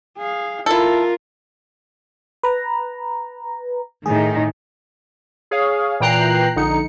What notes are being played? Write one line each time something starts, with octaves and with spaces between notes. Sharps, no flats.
G#4 F5
E4 F4 A4 A#4
B4 A#5
A2 D#3 D#4 G#4
G#4 C#5 F5
A#2 E3 G5 A#5 F#6 C7
A#1 D3 D#4 C#7